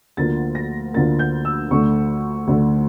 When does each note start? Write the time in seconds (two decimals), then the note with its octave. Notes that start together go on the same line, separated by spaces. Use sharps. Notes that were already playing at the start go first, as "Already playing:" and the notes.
0.17 D2 D3 F3 A#3 A6
0.55 A#6
0.94 D2 D3 F3 A#3 A6
1.19 G6
1.45 E6
1.71 D2 D3 A3 C#6
2.47 D2 D3 A3